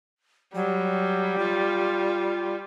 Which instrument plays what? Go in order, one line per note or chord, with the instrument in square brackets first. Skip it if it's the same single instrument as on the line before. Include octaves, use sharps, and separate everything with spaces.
[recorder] F#3 [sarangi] G3
[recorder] F4